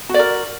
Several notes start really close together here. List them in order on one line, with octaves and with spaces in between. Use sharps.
F#4 D5 A#4